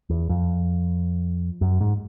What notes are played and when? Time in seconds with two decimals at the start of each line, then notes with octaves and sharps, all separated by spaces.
0.10 E2
0.29 F2
1.61 F#2
1.81 G#2